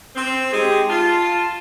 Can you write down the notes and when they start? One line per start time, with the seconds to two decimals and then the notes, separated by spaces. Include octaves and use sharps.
0.15 C4
0.52 G#3 D#4 G4 G#4
0.90 F4 A5